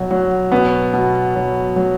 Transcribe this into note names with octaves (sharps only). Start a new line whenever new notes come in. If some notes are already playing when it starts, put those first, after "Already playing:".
Already playing: B2 F#3
F#3
B2 B3
B2
F#3
F#3